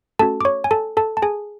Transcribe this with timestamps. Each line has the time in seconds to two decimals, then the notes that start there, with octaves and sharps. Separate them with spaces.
0.19 A3 C#4 F#4 A4 A5
0.41 D6
0.45 C#5 C#6
0.64 G#5
0.71 A4 A5
0.97 A4 A5
1.17 A5
1.22 G#4 G#5